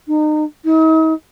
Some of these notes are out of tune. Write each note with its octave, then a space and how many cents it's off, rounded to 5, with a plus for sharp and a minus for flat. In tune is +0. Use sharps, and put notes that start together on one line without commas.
D#4 -30
D#4 +45